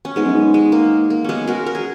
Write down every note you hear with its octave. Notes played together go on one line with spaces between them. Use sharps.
C#4
G#2 G#3 B3
F#2
G#2
G#3
A#3
A#3
G#3 B3 C#4
F#4 A#4
A#4
G#4